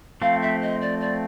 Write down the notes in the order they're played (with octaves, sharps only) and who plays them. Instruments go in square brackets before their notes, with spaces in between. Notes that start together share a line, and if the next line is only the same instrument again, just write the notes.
[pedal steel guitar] F3 A3 C4 [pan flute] F5
[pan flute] E5
D#5
D5
D5